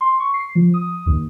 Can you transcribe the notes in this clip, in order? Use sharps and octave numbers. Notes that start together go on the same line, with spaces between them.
C6
C#6
C7
F3
D#6
D#2